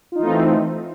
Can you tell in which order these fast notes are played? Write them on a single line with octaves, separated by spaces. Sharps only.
F4 D#4 E3 A3 C4